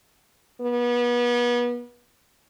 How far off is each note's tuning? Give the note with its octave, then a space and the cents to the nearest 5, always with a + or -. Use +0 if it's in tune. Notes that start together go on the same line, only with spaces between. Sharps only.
B3 -35